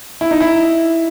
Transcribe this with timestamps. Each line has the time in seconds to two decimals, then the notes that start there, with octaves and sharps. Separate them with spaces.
0.21 E4
0.31 D#4
0.40 E4